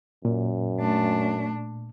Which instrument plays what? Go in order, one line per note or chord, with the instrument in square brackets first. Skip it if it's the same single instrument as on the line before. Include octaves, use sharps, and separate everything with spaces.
[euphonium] F#2 [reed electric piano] A#2
[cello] A3 D4